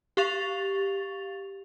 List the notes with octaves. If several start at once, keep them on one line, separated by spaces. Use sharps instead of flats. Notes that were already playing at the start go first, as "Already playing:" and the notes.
G4 F5 C#6 A6 F7